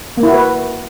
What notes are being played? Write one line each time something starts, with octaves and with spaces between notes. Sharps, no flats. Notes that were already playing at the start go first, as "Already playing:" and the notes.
A#3
E4
F#4
B4